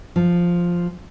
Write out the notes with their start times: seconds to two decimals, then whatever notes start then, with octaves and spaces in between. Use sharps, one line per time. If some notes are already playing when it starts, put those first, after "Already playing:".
0.16 F3